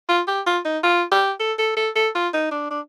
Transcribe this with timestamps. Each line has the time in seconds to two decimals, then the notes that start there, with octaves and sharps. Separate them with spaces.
0.09 F4
0.28 G4
0.46 F4
0.65 D#4
0.84 F4
1.12 G4
1.40 A4
1.59 A4
1.77 A4
1.96 A4
2.15 F4
2.34 D#4
2.52 D4
2.70 D4